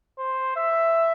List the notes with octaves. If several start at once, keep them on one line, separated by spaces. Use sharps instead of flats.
C5
E5